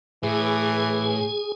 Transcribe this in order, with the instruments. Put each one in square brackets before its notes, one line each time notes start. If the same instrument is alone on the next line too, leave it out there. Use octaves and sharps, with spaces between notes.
[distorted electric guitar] A2 [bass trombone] E3 [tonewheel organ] G#4 G#5